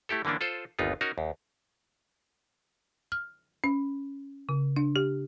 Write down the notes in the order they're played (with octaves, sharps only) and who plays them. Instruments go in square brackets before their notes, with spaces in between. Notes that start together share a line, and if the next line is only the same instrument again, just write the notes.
[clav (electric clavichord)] A3 E4 G4 A4
D3 E3 A#3 C#4 D4
F4 A4 C5
G1 D#2 B3 D#4 F4
C#4 D#4 F#4 A#4
D#2
[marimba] F6
C#4
C#3
D4
G4